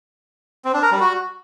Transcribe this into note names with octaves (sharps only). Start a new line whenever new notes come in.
C4
D4
A#4
G3
F#4